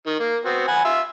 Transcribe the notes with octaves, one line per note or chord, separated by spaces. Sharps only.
D#3
A#3
B3 C4 F#4
F#5 G#5 B5
F4 E5